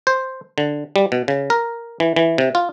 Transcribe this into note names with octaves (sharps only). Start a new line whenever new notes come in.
C5
D3
G3
B2
C#3
A#4
E3
E3
C3
F4